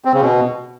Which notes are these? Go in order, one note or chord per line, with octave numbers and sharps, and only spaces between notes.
C4
C#3
B2